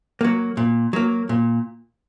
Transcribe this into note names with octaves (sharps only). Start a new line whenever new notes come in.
F#3 A#3
A#2
F#3 A#3
A#2